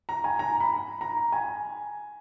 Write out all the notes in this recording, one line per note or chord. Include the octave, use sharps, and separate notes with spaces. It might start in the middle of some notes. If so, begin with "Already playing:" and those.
A#5
G#5
A#5
B5
A#5
G#5